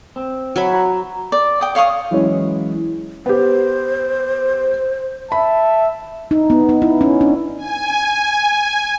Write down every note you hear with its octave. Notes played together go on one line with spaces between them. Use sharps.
C4
F#3 E5 B5
F#4 A#5
D5
G5 D#6
C#5 F5 C#6 D#6
E3 F#3 G#3 C#4 E4 C#5
B3 G4 C5
E5 A5 B5
D#4
B3
D#4
E4
C#4
D4
G#5